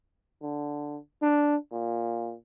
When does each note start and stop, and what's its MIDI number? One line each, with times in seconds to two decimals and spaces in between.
0.42 0.97 50
1.22 1.56 62
1.73 2.34 46